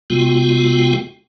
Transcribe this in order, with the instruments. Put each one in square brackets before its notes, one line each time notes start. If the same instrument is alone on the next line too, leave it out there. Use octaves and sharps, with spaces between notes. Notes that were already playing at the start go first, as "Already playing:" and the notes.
[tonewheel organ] C3 G#3 B3 F4 F#4 G5